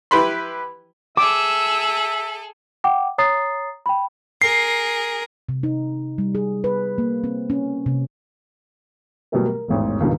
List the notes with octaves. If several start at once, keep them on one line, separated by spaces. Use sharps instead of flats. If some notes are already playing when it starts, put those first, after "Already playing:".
E4 G4 B4 B5 C6
G#4 A4 E5 D6 E6
F#5 G5 D6
C#5 A#5 D#6 A6 C7
G5 B5
G#4 A#4 C7
C3
D#4
G3
G#4
B4
A#3
C4
C#4
C3
B2 F#3 G3 A3 A#3
A#4
E1 A1 G#2
C#2 G2 B2 D#3